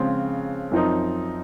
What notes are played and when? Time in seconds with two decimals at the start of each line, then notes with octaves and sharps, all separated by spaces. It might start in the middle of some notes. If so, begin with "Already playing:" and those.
Already playing: C#3 F3 G#3 C4 F4
0.71 F#2 F3 C4 D#4